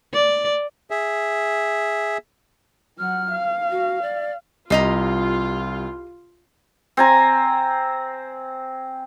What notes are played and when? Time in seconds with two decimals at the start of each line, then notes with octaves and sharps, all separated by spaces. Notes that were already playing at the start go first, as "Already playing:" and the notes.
0.13 D5
0.91 G#4 E5
2.99 F#3 F#5 F6
3.31 F5
3.71 F#4
4.02 D5
4.70 C2 F4 G4 D#5 A#5 C7
6.97 C4 G#5 A#5